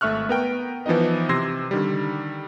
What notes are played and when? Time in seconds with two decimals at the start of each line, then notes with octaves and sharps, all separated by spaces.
0.01 G#1 A3 E5 C#6 F6 F#6
0.29 B3 A#4 G5
0.86 E3 F3 B3 D#4 D#5
1.29 C3 C6 E6 G#6 A#6 C7
1.71 D3 D#3 G3